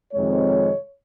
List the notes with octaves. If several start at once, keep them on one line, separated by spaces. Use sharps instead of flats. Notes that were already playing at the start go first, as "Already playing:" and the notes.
F2 C3 D#3 G#3 C#5